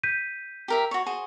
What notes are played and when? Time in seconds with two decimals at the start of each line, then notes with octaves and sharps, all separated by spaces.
0.03 G6 B6 D#7
0.68 G4 A#4 E5
0.91 F#4 C#5
1.06 F#4 G#4 C5